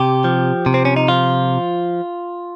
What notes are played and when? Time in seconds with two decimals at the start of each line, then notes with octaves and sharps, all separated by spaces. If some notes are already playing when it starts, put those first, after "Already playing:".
Already playing: C3 G4
0.24 F3
0.66 C3
0.74 C4
0.85 C#4
0.96 D#4
1.08 F3 F4